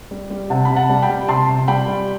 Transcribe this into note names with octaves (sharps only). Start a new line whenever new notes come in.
G3
G3
C3 F#5 A5
C3 B5
F#5 A5
G3
G5 B5
G3
C3 A5 C6
C3
G3 G5 B5
G3